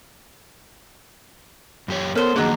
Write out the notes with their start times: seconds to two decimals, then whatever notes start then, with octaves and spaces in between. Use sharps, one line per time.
1.88 F#2 G4 C#5
2.15 B3 A4 A#4 C5 C#5 F6
2.36 D#3 F3 F#3 A#3 D4 G#4 D#5